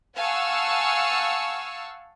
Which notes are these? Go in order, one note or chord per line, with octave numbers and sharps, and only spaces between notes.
F5 F#5 G#5 A5 C#6 E6